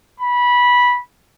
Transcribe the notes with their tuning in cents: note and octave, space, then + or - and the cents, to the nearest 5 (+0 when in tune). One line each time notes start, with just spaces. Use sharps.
B5 -15